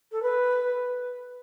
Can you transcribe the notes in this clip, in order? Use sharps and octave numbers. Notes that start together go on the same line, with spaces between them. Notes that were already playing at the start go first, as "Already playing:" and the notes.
A4
B4